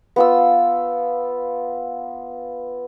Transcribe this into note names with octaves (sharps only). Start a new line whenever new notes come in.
B3 F4 E6